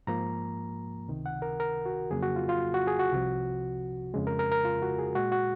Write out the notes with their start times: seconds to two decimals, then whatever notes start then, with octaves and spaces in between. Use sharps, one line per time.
0.07 G#2 F3 A#3 A#5
1.08 C#2 C3 D#3
1.26 F#5
1.42 A#4
1.60 A#4
1.86 F#4
2.10 F2 C#3 F#3 A#3 G#4
2.23 F#4
2.36 F4
2.49 F4
2.74 F#4
2.87 G#4
2.99 F#4
3.13 C2 C3 F3
4.14 F2 C#3 G#3
4.27 A#4
4.39 A#4
4.52 A#4
4.65 F4
4.82 F#4
4.99 G#4
5.15 A#2 G#3 F#4
5.32 F#4